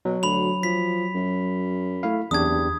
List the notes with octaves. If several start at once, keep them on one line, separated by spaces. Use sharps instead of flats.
B2 F#3
D2 B5 F7
F3 B6
F#2
A3 E4 F5
F#1 E2 D4 G4 D#6 G#6